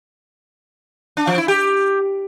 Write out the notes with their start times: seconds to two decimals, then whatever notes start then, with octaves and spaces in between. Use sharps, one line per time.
1.17 D4
1.27 F3
1.38 E4
1.48 G4